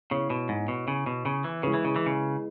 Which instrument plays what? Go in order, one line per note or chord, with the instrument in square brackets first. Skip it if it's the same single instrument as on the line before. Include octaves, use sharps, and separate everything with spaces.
[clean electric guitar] C#3 [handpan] B3 E4 C#5
[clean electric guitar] B2
G#2
B2
C#3
B2
C#3
E3
[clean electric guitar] C#3 [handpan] G#3 E4 G#4 B4
[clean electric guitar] E3
C#3
E3
C#3